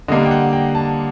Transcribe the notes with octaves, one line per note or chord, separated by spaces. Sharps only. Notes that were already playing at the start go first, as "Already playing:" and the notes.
D3 G3 A#3 D4 D#5
G5
F#5
G5
A5